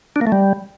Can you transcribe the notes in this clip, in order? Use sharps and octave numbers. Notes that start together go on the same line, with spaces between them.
D4
A#3
A3
G3